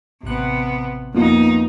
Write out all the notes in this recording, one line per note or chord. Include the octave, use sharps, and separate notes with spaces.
A1 C3 B3 F#6
F2 A#3 B3 D#4 F4